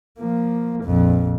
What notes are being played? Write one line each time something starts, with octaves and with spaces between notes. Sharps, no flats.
F3 A#3
A#1 F2